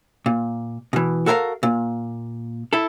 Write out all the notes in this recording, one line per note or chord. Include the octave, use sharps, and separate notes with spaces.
A#2
B2 E3
F#4 A4 A#4 E5 F5
A#2
E4 A4